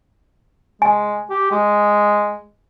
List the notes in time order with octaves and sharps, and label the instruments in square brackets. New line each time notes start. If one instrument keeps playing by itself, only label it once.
[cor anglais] G#3 [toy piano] G#5
[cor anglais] G4
G#3